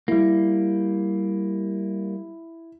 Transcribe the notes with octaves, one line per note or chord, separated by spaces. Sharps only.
G3 A#3 E4